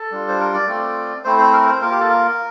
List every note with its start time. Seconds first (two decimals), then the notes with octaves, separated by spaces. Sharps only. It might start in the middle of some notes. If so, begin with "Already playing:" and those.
Already playing: A4
0.11 G3 D4 F4
0.28 C5
0.39 A#4
0.54 D5
0.67 A3 C4 F4
1.24 A3 C4 E4 C5
1.38 C5
1.53 A#4
1.67 C5
1.81 A#3 F4 A#4
1.91 G4
2.01 A4
2.10 A#4